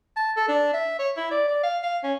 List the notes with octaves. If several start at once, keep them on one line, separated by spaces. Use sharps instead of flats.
A5
A4
D4
E5
C#5
E4
D5
D5
F5
F5
C#4